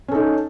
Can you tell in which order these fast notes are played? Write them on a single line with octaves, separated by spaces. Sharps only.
C#4 A4 D#4